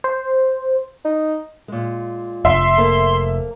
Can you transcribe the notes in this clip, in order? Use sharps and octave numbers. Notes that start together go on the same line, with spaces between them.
C5
D#4
A#2 G#3
F1 E5 C6
A#3 A4 C5